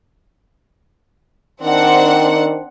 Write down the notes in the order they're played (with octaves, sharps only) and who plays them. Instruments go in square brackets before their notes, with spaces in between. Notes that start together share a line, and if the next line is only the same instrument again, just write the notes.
[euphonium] D#3 [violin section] C4 D4 F#5